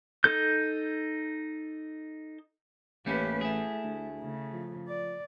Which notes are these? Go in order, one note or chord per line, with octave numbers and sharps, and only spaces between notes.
D#4 A4 G6
A1 A3 A#3 C#4 G4 B4
A3 E4 G#4
D2
C#3 A3
F3
D5